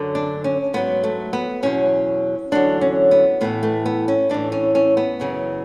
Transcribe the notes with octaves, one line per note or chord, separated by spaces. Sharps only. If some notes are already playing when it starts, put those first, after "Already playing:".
Already playing: F#2 D3 F#3
D4
C#4
G#2 F#3 B3
A3
B3
E2 B2 F#3 C#4
E2 D3 F#3 D4
C#4
B3
A2 E3 B3
A3
B3
C#4
A2 E3 D4
C#4
C#4
B3
F#2 C#3 E3